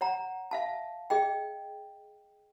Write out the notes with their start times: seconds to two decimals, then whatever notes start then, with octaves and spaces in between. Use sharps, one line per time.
0.01 C#5 F#5 A#5
0.51 E5 F5 A5
1.10 G#4 D#5 G5